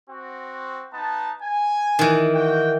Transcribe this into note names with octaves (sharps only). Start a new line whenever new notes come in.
C4 F#4
B3 D#4 A5
G#5
D#3 E3
F#4 G5